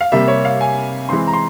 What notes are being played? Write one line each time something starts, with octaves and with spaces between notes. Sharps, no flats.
F5
C3 G3 A#3 E5
C#5
F5
G#5
E3 G#3 C4 C6
A#5
C6